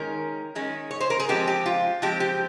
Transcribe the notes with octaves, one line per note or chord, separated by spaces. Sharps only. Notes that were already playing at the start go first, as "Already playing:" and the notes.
Already playing: D#3 G#3 C#4 A#4
D#3 G#3 C#4
C#5
C5
A#4
G#4
F3 G#3 C4 G4
G4
F4
F3 G#3 C4 G4
G4